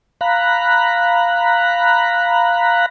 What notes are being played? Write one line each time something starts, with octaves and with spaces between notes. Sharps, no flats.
F5 A#5 B5 F#6